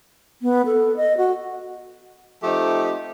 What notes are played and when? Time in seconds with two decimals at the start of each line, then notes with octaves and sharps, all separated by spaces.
0.42 B3
0.66 A4
0.97 D#5
1.18 F#4
2.43 F3 A3 C4 D#4 G4